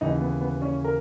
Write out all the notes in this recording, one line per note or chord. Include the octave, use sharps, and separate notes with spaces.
D#2 C#3 E3 D#4
B3
B3
C#4
A#4